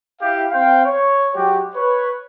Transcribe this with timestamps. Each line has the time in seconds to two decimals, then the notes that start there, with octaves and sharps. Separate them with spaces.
0.22 E4 G4 F5
0.51 C4 C5 F5 G5
0.85 C#5
1.35 F#3 G#3 F#4 G4
1.75 B4 C#5